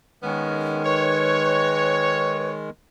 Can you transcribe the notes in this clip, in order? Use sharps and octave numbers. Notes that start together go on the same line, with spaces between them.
D#3 G#3 B3 C#4
B4 C#5